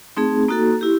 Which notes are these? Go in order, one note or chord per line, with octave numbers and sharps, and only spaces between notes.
A3 C4 D#4 G#4
A#3 D#4 F#4 A4
E4 G4